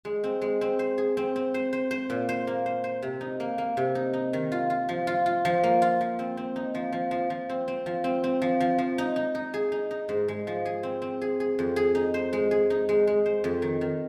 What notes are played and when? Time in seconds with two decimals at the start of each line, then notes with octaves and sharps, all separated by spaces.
0.05 G#3
0.24 C4
0.42 G#3
0.61 C4
0.79 C5
0.98 G#4
1.17 C4
1.36 C4
1.54 C5
1.73 C5
1.91 C5
2.10 A#2
2.29 C5
2.47 A#3
2.66 C5
2.84 C5
3.02 C3
3.21 D#4
3.40 A#3
3.58 A#3
3.77 C3
3.95 D#4
4.14 D#4
4.33 D#3
4.52 F4
4.70 F4
4.89 F3
5.07 F4
5.26 F4
5.45 F3
5.64 A#3
5.82 F4
6.01 F3
6.19 C4
6.37 C4
6.56 D#4
6.75 F3
6.93 F3
7.11 F3
7.30 F3
7.50 C4
7.68 C4
7.86 F3
8.04 C4
8.24 C4
8.42 F3
8.60 F3
8.79 F3
8.98 D#4
9.16 D#4
9.35 D#4
9.54 G#4
9.72 D#4
9.91 D#4
10.09 G#2
10.28 G#3
10.47 F3
10.65 G#4
10.83 C4
11.02 C4
11.21 G#4
11.40 G#4
11.59 F2
11.76 G#4
11.95 D#4
12.14 C5
12.33 G#3
12.51 G#4
12.70 D#4
12.89 G#3
13.07 G#3
13.26 C5
13.44 F2
13.62 D#3
13.81 D#3